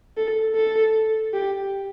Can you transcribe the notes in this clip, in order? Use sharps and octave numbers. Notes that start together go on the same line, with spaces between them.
A4
A4
G4